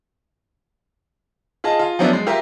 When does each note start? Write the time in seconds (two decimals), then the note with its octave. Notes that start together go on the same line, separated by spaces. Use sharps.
1.64 F4 G#4 D#5 A5
1.79 F4
1.99 F3 F#3 B3 C#4 D4 E4
2.13 G#3
2.27 F4 G4 A#4 E5